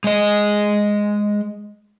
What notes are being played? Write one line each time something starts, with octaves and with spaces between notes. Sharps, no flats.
G#3 D#5